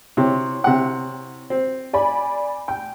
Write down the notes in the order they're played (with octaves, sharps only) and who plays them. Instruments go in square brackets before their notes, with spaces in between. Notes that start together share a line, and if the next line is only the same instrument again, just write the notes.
[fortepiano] C3 [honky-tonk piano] E4 C#5
[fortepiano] C3 F#5
C4
[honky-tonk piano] D5 G#5 B5
G5